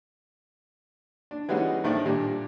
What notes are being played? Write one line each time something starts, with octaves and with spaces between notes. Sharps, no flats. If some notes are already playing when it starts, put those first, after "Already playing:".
D4
E3 G3 G#3 C#4 D#4 F#4
A2 D#3 F3 A3 D4
A#2 G3 D4